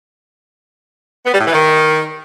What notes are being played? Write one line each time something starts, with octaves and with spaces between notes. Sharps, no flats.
B3
G3
A2
E3
D#3